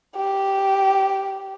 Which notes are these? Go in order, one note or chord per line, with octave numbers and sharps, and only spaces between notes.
G4